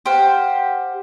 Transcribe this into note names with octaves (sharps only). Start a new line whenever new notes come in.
G4 C5 F5 F#5